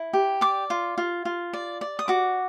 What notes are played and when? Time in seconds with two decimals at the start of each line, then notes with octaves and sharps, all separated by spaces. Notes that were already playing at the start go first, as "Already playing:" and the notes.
Already playing: E4
0.13 G4
0.41 D5 D6
0.70 F4
0.98 F4
1.25 F4
1.53 D5
1.81 D5
1.99 D#6
2.08 F#4 D6